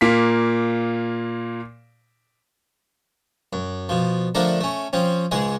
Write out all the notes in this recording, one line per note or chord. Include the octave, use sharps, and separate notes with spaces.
A#2 A#3 B6
F#2
B2 F3
D3 F3 A3 D4 A#4
A3 C#4
F3 C4 C#4
C#2 G#2 G#3 G#4